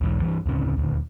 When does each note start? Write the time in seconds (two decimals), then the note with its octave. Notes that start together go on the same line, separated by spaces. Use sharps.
0.01 B1 E2 G#2
0.22 G2 E3
0.46 D2 A2 C#3 C4
0.77 D#1 D2